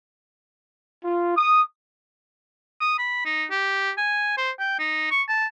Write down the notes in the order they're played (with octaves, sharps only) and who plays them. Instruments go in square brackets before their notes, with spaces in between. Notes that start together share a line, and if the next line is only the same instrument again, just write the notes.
[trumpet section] F4
D#6
[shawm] D#6
B5
D#4
G4
G#5
C5
G5
D#4
C#6
A5